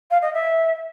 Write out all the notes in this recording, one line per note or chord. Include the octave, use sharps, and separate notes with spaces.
F5
D#5
E5